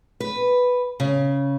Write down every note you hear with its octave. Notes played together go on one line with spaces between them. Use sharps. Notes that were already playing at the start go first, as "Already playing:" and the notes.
B4
C#3